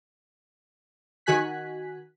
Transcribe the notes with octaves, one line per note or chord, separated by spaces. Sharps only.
D#3 F#4 G#5 F#6 B6